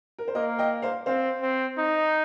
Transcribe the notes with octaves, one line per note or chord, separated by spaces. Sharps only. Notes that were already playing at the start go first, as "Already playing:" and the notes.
A#4
C5
A#3 A#4 D#5
D#5 G5
C5 F5
C4 C5 F5
C4
D#4